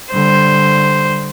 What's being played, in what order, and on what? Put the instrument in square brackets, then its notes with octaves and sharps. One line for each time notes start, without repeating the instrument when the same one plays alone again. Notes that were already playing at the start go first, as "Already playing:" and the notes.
[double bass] D3 G3 [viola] C5